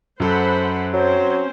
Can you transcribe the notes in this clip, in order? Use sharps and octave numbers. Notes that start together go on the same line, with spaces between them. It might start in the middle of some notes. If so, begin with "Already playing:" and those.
F#2 A4 C5 F#5 B5
F#3 C4 C#4 C5